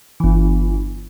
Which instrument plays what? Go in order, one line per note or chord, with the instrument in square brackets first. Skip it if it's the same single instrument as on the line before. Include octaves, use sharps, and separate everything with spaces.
[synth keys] G1 E3